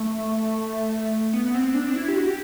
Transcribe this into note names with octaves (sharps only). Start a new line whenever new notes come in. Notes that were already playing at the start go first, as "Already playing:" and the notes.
Already playing: A3
B3
B3
C4
D4
D4
E4
G4
F#4
G4